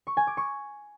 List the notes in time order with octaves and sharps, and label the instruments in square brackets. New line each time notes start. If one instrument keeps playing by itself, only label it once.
[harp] C#6
G#5
D6
C#6